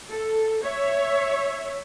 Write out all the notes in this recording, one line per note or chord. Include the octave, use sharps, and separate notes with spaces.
A4
C#5 E5